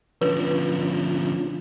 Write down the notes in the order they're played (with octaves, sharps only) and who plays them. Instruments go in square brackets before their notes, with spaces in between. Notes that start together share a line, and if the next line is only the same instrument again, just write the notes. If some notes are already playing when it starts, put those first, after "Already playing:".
[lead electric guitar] D2 F3 [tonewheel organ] C#4 D4 F4 [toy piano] B4